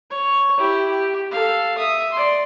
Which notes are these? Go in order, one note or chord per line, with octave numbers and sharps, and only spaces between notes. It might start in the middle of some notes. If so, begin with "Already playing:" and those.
C#5
E4 G4
G4
A4 F5
E5 D#6
D5 C6